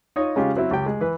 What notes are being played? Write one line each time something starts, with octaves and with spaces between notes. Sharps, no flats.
D#4 F4 C#5 D#5
C#3 G#3 C#4 F4 G4
F#3 C4 E4
C#2 G4 G5
G#3
E3 B4